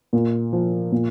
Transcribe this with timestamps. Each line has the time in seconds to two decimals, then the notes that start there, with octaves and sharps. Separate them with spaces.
0.13 A#2
0.53 F3
0.92 A#2